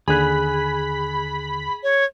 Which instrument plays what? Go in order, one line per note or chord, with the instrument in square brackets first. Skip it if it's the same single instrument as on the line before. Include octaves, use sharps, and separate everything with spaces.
[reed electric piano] D#2 D3 F#6 [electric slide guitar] G#4 [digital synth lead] B5
[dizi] C#5